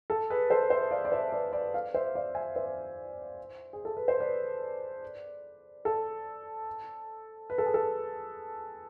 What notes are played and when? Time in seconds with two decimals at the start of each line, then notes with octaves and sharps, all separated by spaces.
0.10 A4
0.30 G#4 B4
0.50 A4 C5
0.70 C5 E5
0.91 D5 F5
1.05 D5
1.12 C5 E5
1.32 B4 D5
1.53 B4 D5
1.74 D5 F5
1.94 C5 E5
2.15 D5 F5
2.35 E5 G#5
2.55 C5 E5
3.73 G#4
3.85 A4
3.97 B4
4.08 C5
4.20 B4 D5
5.85 A4
7.50 B4
7.58 A4
7.66 G#4
7.74 A4